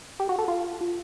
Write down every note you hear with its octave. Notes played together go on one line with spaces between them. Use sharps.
G4
F#4
A4
F4